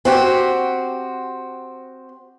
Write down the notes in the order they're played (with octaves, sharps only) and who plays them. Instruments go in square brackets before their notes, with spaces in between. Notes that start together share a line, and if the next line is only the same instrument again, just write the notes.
[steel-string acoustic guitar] C4 F#4 G4